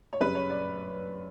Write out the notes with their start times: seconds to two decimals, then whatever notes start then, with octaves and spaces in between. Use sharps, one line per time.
0.13 C#5
0.21 F#2 C#3 G3 B4
0.35 C#5
0.50 D5